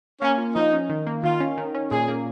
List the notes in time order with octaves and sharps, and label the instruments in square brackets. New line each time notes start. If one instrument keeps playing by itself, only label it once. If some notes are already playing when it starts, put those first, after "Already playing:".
[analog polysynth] A#3 [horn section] C#4
[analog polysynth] F4
[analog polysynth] F3 [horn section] D#4
[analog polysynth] C#4
D#3
A#3
[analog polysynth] D#3 [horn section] F4
[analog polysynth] C#4
D#3
C#4
[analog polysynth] A#2 [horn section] G#4
[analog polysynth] A#3